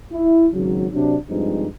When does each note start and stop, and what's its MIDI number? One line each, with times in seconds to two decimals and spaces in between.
0.12 0.48 64
0.54 0.87 32
0.54 0.87 49
0.54 0.87 54
0.93 1.16 48
0.93 1.16 54
0.93 1.16 62
1.29 1.66 43
1.29 1.66 53
1.29 1.66 56
1.29 1.66 60
1.29 1.66 63